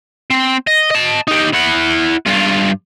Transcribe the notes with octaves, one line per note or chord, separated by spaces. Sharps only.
C4
D#5
D#5 A5
D#4 G4
E4 F#5
G2 F4